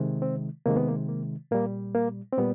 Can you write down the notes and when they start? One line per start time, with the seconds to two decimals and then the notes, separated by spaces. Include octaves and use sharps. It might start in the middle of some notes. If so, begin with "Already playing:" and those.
Already playing: C3 D#3 G#3
0.22 C4
0.66 C3 D#3 G#3 A#3
0.76 B3
0.88 A#3
1.09 A#3
1.51 A#2 G3 A#3
1.95 A#3
2.33 C4
2.38 A#2 G3 B3